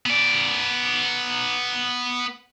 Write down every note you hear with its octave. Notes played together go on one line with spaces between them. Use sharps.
B3 D5